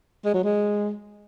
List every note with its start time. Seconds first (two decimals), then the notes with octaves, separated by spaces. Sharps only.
0.25 G#3
0.34 F#3
0.44 G#3